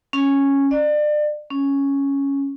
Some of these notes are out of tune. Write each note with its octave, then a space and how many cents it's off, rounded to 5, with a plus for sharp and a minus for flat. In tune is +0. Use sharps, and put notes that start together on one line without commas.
C#4 -5
D5 +30
C#4 +0